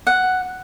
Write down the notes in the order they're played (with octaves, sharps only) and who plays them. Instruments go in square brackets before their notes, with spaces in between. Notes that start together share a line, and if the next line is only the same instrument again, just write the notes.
[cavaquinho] F#5